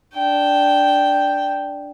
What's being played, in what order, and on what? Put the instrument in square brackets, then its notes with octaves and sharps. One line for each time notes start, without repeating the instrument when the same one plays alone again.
[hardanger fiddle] D4 G5